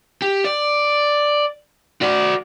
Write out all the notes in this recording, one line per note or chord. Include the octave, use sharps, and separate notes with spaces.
G4
D5
F#4 D5